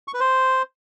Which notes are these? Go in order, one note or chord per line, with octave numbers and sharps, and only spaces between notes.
C#6
B4
C5